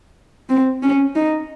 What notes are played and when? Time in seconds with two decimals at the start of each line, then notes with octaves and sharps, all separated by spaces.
0.49 C4
0.83 C#4
1.15 D#4